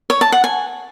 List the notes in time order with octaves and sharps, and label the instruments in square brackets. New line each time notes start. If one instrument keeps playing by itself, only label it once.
[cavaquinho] C#5
A5
F#5
G#5